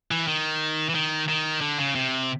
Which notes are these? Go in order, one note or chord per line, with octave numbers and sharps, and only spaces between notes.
E3
D#3
E3
D#3
D#3
D3
C#3
C3